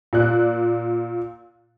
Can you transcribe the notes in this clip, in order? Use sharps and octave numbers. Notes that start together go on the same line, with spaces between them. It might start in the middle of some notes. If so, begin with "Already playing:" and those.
A#2 D5 F#6